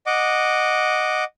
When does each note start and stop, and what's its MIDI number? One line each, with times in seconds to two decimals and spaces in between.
0.06 1.24 75
0.06 1.24 78
0.06 1.24 86